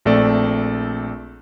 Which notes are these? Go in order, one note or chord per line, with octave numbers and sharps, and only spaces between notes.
A#1 A3 C4 A4 D5